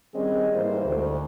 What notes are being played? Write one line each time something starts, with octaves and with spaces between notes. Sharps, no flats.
D#3 G3 C4 C#4 G#4 D#5
G#2 E3 G3 A#3 C5
D2